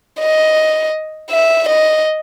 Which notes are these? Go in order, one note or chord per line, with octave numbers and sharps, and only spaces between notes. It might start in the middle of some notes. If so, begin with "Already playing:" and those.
D#5
E5
D#5